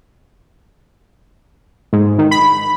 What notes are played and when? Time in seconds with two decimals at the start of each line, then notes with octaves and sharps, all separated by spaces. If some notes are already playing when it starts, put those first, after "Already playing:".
1.93 G#2
2.18 D#3
2.31 B5